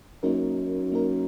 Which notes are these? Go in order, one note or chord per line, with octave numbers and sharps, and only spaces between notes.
F#2 A#3 D#4 A#4
A#3 D#4 A#4